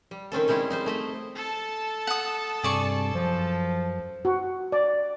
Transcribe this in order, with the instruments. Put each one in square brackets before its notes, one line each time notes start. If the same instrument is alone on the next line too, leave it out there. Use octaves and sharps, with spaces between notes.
[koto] G3
D#3 C4 C#4 A4
G3 G#3 C4 E4
D#4 E4 C5
A3 D#5 E5
[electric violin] A4 A5
[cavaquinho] F#5 D#6
[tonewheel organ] G2 C3 [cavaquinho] G#4 D5 C#6
[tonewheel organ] F#2 [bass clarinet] F3
[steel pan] F#4
D5